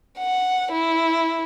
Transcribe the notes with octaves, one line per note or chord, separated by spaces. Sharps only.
F#5
E4